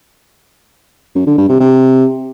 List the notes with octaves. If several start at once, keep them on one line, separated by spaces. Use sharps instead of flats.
F#2
D3
G2
C3
C3